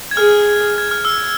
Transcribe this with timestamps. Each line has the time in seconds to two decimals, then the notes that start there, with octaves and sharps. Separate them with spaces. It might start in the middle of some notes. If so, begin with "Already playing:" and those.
0.11 G#6
0.17 G#4 F6
0.78 G#6
0.91 F6
1.05 E6